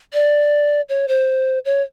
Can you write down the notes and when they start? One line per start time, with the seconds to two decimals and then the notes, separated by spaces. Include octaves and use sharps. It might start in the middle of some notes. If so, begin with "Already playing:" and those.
0.14 D5
0.89 C#5
1.08 C5
1.65 C#5